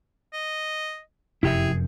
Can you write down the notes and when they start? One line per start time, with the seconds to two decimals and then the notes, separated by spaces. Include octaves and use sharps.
0.33 D#5
1.43 F1 F#2 C3 E4 G4 G#4 E5